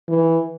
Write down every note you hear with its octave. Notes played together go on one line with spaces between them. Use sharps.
E3